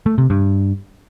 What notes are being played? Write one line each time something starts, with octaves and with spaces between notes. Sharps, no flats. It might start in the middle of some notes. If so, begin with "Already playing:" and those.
A3
C3
G2